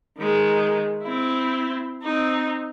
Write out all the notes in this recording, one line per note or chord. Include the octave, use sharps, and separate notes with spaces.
D#3 G#3
C4 E4
C4 D#4